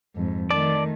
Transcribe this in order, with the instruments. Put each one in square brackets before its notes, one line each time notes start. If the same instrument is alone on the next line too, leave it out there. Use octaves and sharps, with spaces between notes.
[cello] F2 G#2
[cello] D#3 A3 [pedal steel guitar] D5 A5